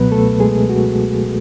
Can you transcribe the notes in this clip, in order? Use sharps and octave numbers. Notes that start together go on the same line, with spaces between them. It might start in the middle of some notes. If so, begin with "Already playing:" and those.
Already playing: C#2 B2 F#3 B3 B4
A3 A4
G#3 G#4
F#4